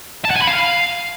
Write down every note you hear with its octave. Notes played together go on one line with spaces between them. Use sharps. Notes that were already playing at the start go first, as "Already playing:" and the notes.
A5
F#5
G#5
B5
F5